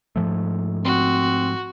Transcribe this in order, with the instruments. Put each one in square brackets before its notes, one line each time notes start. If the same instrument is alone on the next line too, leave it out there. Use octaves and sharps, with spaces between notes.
[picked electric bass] G#2 F3 A3
[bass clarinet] C4 [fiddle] F#4